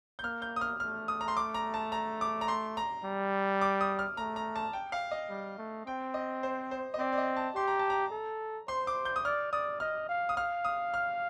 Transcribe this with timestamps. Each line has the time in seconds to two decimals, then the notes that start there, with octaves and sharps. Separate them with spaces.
0.19 G6
0.24 A#3 F6
0.42 G6
0.56 D#6
0.61 F6
0.80 A3 F6
1.08 D#6
1.21 A#5
1.28 C6
1.37 D6
1.54 A#5
1.74 A5
1.92 A#5
2.21 D6
2.41 A#5
2.48 C6
2.77 A#5
3.04 G3
3.61 D6
3.81 D#6
3.99 F6
4.17 A3 A#5
4.36 A#5
4.56 A5
4.73 G5
4.92 F5
5.11 D#5
5.30 G3
5.58 A3
5.86 C4 G5
6.14 D#5
6.43 C5
6.71 C5
6.94 D#5
6.99 C4 D5
7.12 D5
7.18 D#5
7.37 A5
7.55 G4 C6
7.68 A#5
7.79 A5
7.90 A#5
8.11 A4
8.68 C5 C6
8.87 D6
9.05 G6
9.16 D#6
9.24 D5 F6
9.53 D5 D#6
9.80 D#5 F6
10.09 F5
10.29 D#6
10.37 F5 F6
10.65 D#6
10.94 F6